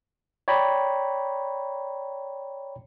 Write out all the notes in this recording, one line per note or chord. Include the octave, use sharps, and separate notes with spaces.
C#5 D5 G5 A#5 B5